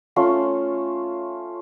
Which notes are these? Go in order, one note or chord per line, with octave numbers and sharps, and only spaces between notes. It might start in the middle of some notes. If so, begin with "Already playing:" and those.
A3 C#4 F4 C6